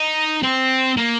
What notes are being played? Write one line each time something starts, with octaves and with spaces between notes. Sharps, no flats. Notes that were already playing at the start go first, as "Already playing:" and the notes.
Already playing: D#4
C4
A#3